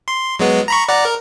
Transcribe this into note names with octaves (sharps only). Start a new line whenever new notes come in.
C6
F#3 G#3 B3
A#5 B5 C#6
D5 F#5 A#5
A#4